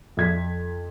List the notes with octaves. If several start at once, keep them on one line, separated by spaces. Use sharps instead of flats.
F2 G#6 B6